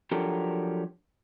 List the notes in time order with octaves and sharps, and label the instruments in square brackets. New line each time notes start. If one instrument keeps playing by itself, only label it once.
[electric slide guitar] F3 F#3 D4 G4 A4 A#4